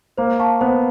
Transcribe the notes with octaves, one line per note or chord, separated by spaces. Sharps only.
A#3 C5
F5 A5 C#6
B3 C5